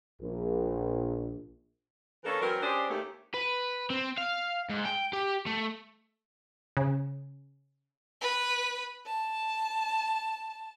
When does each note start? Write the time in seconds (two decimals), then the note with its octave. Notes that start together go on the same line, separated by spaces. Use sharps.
0.21 A#1
2.24 E3 A#3 C#4 D4 A4
2.41 E3 F#3 C4 A#4
2.61 C#4 D4 G4 G#4 C5 D5
2.89 D#2 A3 G4
3.34 B4
3.90 C4
4.18 F5
4.69 G#2
4.85 G5
5.13 G4
5.46 A3
6.77 C#3
8.21 B4
9.06 A5